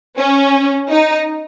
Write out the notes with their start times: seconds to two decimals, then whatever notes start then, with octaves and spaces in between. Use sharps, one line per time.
0.18 C#4
0.90 D#4